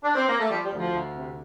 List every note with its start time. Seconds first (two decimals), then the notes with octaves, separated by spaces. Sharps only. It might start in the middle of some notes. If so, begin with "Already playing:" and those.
0.03 D4
0.14 C4
0.27 A#3
0.39 A3
0.49 F3 G3
0.64 G3
0.72 D2
0.78 F3
0.93 D2
1.14 C3